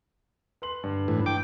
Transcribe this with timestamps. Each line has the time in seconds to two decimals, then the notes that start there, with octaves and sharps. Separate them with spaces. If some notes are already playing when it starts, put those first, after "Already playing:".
0.62 B4 C6 F#7
0.84 G2 D3
1.08 A2 E3
1.26 G5 D6